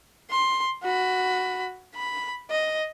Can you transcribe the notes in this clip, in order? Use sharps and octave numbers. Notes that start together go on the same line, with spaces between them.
C6
F#4 B5
B5
D#5